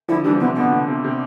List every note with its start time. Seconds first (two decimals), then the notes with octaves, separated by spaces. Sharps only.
0.08 D3 F3 E4
0.24 E3 G3 D4
0.34 F3
0.40 C3 E3 B3
0.56 B2 D3 B3
0.72 B2
0.88 C3
1.04 C3